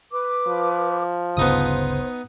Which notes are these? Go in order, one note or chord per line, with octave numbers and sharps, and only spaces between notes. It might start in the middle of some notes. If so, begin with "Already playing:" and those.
B4 D6
F3
G1 D2 C#3 B3 D#4 C5 D#6